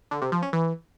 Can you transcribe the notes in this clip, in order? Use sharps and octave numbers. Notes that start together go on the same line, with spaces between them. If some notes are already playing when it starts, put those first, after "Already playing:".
D3
C3
F3
C#4
E3